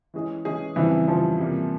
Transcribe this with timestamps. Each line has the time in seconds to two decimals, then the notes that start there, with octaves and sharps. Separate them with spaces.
0.14 E3 G#3 C#4 E4 G#4
0.45 E3 G#3 C#4 E4 G#4
0.76 F2 C#3 E3 G3 C4
1.07 F2 C#3 F3 G3 C4
1.39 C3 G3 A#3